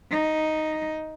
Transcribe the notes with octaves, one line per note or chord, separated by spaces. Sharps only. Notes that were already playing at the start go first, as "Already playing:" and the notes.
D#4